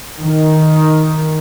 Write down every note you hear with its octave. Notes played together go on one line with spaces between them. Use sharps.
D#3